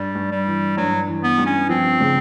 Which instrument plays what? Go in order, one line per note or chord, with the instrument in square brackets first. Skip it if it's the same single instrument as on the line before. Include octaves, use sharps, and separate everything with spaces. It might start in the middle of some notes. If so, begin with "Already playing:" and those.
Already playing: [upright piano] G2 [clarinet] G3
[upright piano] G2
[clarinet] G3
[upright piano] E3
[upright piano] G2 [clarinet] F#3
[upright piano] E3
[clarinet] B3
[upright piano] G2
[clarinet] C#4
[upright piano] F3 [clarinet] C4
[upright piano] C#3